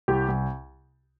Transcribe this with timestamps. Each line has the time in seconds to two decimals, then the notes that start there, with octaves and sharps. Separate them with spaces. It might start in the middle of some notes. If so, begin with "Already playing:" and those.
0.08 C2 G4
0.28 C2